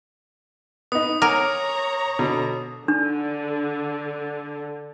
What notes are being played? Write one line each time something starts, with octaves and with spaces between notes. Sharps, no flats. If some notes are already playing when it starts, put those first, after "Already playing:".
B3 D#4 D#6
A#4 C#5 F#5 G#5 A#5 D6
B2 D3
D3 D4